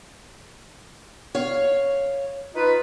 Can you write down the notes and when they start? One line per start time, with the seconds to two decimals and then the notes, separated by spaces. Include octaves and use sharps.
1.35 C#5 F5
2.55 D#4 F4 B4